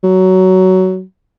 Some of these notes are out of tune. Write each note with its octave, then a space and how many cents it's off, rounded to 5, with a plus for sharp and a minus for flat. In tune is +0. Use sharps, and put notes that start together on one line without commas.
F#3 +15